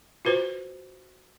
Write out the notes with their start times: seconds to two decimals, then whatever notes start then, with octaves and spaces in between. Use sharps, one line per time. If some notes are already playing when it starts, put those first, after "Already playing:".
0.25 F4 F#4 B4 C5